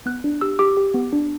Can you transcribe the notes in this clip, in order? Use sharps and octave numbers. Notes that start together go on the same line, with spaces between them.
B3 F#6
D4
G4 E6
G4 D6
G4
B3
D4